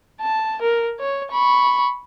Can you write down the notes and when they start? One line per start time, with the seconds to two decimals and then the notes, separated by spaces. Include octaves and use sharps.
0.21 A5
0.62 A#4
0.99 C#5
1.32 B5 C#6